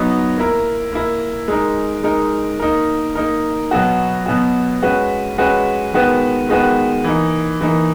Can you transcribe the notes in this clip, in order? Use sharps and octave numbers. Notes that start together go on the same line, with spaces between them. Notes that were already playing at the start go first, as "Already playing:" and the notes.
Already playing: F#3 B3 D#4
A#3 E4 A#4
A#3 E4 A#4
G#3 D#4 A#4
G#3 D#4 A#4
A#3 D#4 A#4
A#3 D#4 A#4
B2 F#3 B3 F#4
B2 F#3 B3 F#4
G#3 C#4 F#4 B4
G#3 C#4 F#4 B4
D#3 G#3 B3 F#4 B4
D#3 G#3 B3 F#4 B4
E3 A#3 D#4
E3 A#3 D#4